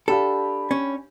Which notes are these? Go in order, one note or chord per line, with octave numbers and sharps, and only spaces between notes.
D4 G4 A4 F5 B5
C#4